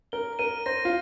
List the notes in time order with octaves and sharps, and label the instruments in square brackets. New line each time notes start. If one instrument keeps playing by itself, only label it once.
[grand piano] A#4 [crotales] G7
[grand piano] A#4 [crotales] D#7
[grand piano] C5 [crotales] A#6
[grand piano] F4